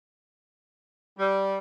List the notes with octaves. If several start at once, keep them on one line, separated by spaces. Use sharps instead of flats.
G3